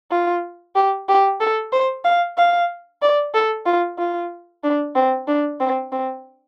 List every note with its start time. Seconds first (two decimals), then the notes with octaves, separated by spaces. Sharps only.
0.11 F4
0.75 G4
1.09 G4
1.40 A4
1.72 C5
2.05 F5
2.38 F5
3.02 D5
3.34 A4
3.66 F4
3.98 F4
4.63 D4
4.95 C4
5.28 D4
5.60 C4
5.92 C4